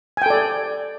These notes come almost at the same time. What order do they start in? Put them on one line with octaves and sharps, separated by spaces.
G#5 G5 A4 D5